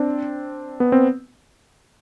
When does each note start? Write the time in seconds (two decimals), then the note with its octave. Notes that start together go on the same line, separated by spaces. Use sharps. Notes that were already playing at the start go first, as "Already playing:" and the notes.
Already playing: C4 D4
0.80 B3
0.92 C4